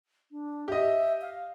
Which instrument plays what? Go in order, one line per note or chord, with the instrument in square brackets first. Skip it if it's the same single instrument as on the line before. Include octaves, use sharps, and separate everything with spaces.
[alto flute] D4
[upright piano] G4 D#5 [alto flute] E5
[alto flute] F5